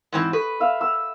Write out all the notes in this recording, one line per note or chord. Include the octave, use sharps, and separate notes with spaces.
G#2 E3 C4
G4 A4 B4
E5 F5
F#5 E6